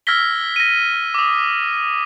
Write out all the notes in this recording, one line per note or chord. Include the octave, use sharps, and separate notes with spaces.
E6 F6 G#6 A#6 B6 G7
A#6 D#7
D6 D#6